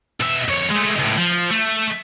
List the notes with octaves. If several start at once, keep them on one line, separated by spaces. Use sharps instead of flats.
B2 E5
F2 C#5
G#3 A3
C#2 A2
F3
A3